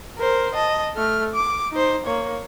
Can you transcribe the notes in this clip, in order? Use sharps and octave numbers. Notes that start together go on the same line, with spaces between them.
A#4 C5
D#5 A5
A3 F6
D6
D#4 C5
A#3 C#5